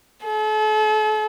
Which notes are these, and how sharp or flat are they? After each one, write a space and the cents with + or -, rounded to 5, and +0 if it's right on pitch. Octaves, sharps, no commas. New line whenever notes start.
A4 -40